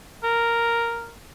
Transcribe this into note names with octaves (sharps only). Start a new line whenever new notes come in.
A#4